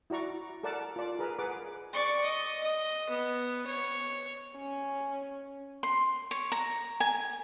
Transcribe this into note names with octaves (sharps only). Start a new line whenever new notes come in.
E4 F#4 D5 A#5 C#6
A4 A#4 D5 F#5 A5
F4 D5
G#4 A#4 B4
G#4 B4 F#5 D6
D5 C#6
D#5
D#5
B3
C#5
C#4
C6
C#5
A#5
G#5